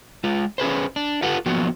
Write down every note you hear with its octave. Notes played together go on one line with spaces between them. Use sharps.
G#3 F4
C#4 G#4 B4 C5
D4
F4 G4 A4 B4 F#5
F3 F#3 A#3 B3 F#4